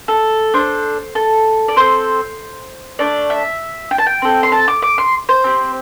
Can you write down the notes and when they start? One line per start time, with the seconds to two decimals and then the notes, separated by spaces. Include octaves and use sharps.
0.08 A4
0.54 D4 A4 C5
1.15 A4
1.68 D5
1.76 C4 A4 C5
2.99 A3 D4 A4 D5
3.30 E5
3.91 G5
3.98 A5
4.06 G5
4.22 C4 A4
4.43 C6
4.52 A5
4.68 D6
4.82 D6
4.98 C6
5.29 C5
5.44 C4 G4